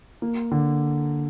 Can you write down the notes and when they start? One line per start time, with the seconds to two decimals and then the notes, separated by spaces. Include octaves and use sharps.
0.22 A#3
0.51 D3